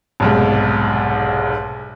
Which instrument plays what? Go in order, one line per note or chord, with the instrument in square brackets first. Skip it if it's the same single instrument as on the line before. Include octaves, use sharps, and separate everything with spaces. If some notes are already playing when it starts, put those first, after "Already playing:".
[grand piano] F1 B1 G#2